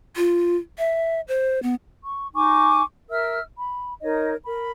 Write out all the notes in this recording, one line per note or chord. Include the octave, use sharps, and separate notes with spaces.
F4
E5
C5
B3
C#6
D#4 G#5 C#6 D6
A#4 E5 E6 F6
B5
D#4 A#4 C#5 D#5
A#4 B5